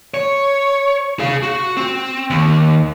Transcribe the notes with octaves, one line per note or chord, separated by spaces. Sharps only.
C#5
G#4 F5
F#4
C4
D#2